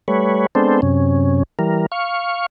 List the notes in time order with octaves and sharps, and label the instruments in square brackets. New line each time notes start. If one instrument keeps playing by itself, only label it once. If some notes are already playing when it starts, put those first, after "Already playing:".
[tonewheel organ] G3 A3 B4 C#5
G#3 B3 C4 D4 A4 C5
F#2 C3 C#4
E3 G3 A#4
F5 C#6